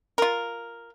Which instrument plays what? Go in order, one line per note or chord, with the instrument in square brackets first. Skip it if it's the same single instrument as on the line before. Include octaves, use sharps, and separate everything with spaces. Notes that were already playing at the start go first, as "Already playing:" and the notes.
[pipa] F4 A#4